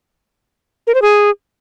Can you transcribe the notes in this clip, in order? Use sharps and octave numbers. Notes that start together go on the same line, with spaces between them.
A#4
C5
G#4